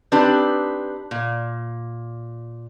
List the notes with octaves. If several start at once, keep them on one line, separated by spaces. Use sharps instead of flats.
C4 D4 D#4 G4 B4
A#2